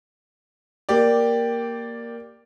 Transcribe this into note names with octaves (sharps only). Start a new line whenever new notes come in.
A#3 G4 D5